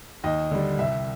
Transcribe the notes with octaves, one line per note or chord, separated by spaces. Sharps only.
D#2 D#5
D3 G3
C2 E5